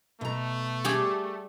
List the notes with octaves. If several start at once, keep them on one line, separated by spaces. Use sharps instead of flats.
B2 A3 A#5
G3 G4 G#4